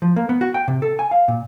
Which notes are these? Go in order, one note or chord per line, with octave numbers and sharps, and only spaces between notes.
F3
A#3
B3
F#4
G5
C3
A4
G#5
F5
A#2